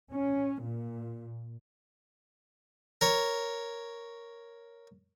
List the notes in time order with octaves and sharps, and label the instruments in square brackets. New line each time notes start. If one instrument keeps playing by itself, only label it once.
[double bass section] C#4
A#2
[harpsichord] A#4 C#5